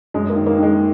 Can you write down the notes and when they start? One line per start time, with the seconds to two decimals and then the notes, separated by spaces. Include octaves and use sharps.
0.14 F#2 G#3
0.30 A#3
0.35 D#3
0.47 A#3
0.58 D#3 G#3